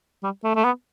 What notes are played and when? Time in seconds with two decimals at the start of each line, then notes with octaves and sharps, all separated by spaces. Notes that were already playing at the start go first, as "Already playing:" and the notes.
0.23 G3
0.44 A3
0.55 A3
0.64 B3